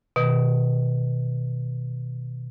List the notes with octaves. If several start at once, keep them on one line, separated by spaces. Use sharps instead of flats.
B2 D#3